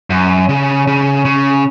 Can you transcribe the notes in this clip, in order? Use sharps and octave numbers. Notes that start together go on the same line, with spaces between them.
F#2
C#3
C#3
C#3